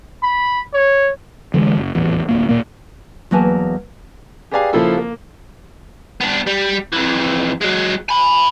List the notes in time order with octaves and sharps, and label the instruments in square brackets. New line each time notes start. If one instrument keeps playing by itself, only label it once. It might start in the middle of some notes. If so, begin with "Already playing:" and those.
[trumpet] B5
C#5
[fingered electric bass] D3 E3 G3 G#3
F#1
D#1 A1 E2
D1 D#2 A#3
D#1 A#2 A#3
[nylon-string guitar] E2 F#3 A#3 B4 G#5 A5
[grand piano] G4 G#4 B4 D5 F5 G#5
C#3 F3 A#3 E4 F4 A4
A#3
[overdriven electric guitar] B3 D4
G3
F2 E3
F#3 G#3
G#5 B5